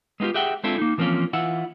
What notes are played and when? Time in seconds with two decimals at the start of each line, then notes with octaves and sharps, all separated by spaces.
0.20 G#3 B3 D#4 F4 G4
0.34 G4 G#4 E5 F#5 G5
0.64 G#3 C4 D4 E4 F4 A4
0.78 A#3 D#4
0.98 E3 F3 A#3 C4 C#4 F4
1.33 E3 E4 F4 E5 F#5